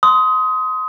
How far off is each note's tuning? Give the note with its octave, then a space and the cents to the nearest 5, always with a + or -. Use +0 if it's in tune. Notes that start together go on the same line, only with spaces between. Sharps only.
C6 -15 D#6 +20